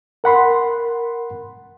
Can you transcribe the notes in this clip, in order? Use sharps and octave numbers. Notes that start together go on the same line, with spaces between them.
A#4 F#5 B5 C6